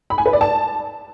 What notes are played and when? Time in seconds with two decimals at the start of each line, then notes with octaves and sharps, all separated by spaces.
0.10 B5
0.18 G#5
0.26 B4
0.33 D5
0.41 A5